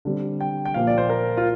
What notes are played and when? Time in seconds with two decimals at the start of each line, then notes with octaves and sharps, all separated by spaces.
0.05 D3 G3 C4
0.41 G5
0.65 G5
0.74 A#2 F3 A#3 F5
0.87 D5
0.98 C5
1.10 A#4
1.37 F4